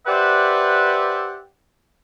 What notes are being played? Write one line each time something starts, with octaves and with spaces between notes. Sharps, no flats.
G4 B4 C5 D5 E5 F#5